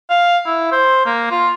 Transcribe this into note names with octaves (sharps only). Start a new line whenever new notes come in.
F5
E4
C5
A#3
F4